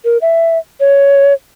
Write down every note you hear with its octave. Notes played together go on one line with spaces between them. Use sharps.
A#4
E5
C#5